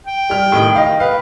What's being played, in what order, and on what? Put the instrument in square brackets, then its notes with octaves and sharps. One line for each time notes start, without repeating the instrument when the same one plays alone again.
[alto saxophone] G5
[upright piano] G3 F6
A2 D#3
D#5 F5
[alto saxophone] B4 [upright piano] F5